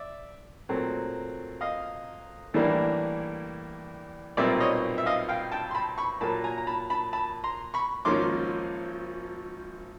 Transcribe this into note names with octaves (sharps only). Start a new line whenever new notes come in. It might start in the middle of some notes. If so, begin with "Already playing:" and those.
Already playing: D5 E5
A#2 F#3 A3 C4
D#5 F5
A2 E3 G3 A#3 D4
B1 A#2 G3 C4 D5 E5
C#5 D#5
E5
D#5 F5
F5 G5
G5 A5
C6
A5 B5
B5 C#6
A#2 F#3 A#3 A5 B5
G#5 A#5
A#5
A5 B5
A5 B5
A5 B5
A#5 C6
B5 C#6
G#1 G#2 F3 A#3 C#4 C6 D6